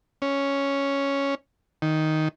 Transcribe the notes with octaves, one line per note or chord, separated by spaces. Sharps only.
C#4
D#3